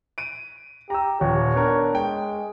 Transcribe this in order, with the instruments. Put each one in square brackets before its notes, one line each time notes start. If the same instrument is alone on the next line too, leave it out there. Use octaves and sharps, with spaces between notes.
[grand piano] D7 D#7
[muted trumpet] G4 [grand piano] A#5 E6
[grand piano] D#1 [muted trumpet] C#5
[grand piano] B3 D4 A#4
[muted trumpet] G#3 [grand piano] G5